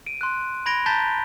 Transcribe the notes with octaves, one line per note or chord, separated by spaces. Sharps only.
D7 D#7
C6 F#6
B5 G#6 A#6 D7 F7 G7
A5 A#5 G6 A6 B6 G7